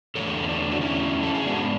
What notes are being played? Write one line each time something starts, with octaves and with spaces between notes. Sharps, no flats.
E2 D3 A3 A4 C#5
C#4
D4
F#4
C#4 E4
A4
G#4
G#2 G#3 B3 D4 F#4